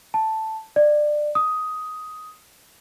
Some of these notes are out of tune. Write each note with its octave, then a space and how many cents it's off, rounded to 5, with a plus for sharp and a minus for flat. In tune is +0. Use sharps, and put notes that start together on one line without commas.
A5 +0
D5 +20
D#6 +10